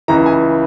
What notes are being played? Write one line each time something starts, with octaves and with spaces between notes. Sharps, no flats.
C#2 C#3 E3 A#5
G#5